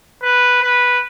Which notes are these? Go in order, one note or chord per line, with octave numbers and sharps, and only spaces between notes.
B4
B4